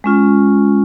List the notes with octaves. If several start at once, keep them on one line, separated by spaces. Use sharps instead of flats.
G#3 C#4 F4